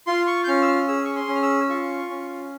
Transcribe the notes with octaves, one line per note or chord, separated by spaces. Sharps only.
F4 C6
C#6
G6
C#4 F6
E6
F6
G#4 E6
C#6
C6
C#4
F6
E6
F4 C#6
C#4